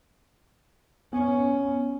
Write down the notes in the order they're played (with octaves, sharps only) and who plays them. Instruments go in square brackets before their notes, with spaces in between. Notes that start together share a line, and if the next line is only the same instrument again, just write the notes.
[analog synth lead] B3 [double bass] C#4